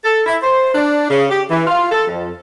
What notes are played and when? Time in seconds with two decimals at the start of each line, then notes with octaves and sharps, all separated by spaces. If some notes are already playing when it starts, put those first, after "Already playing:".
0.04 A4
0.25 E4
0.43 C5
0.74 D4
1.10 C#3
1.29 G4
1.49 E3
1.66 F4
1.90 A4
2.07 F2